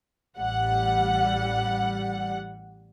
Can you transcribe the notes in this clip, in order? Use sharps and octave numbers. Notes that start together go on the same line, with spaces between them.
A1 G3 F#5